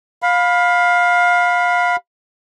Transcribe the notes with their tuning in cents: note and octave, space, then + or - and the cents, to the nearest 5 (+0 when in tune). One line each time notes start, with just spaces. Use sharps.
F5 +20 B5 +0